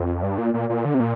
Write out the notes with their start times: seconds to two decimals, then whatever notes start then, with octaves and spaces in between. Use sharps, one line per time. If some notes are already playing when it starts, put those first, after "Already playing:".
Already playing: F2
0.23 G2
0.38 A#2
0.54 A#2
0.69 A#2
0.85 D3
0.94 C3
1.00 A#2